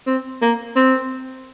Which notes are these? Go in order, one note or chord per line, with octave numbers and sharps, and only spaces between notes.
C4
A#3
C4